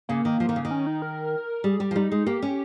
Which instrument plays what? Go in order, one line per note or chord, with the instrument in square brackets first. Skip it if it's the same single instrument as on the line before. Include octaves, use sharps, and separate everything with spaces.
[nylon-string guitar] C#3 [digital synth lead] A#3
[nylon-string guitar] D#3
F3
D#3
C#3
D#3
[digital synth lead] C#4
D#4
A#4
[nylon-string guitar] G3 [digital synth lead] G#4
[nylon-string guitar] G3 [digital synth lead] G4
[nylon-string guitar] F3
[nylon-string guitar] G3 [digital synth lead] D#4
[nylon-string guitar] G#3
[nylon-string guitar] A#3 [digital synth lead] G4
[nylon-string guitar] C#4